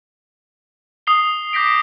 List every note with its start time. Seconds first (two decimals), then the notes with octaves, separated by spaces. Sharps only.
1.07 D#6 C7 G7
1.53 D6 G6 A#6 B6 D7